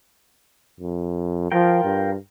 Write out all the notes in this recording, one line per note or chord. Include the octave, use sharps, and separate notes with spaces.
F2
F3 F4 A#4 G5
G2